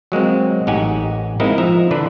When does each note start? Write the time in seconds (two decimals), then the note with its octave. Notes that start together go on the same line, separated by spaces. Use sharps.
0.12 F#3 G#3 A#3 C4
0.67 A1 D#4 G4 F#5 G#5
1.40 G#3 A#3 C4 D#4 E4 A#4
1.58 F3 E5 A#5
1.91 D3 E3 D4 B4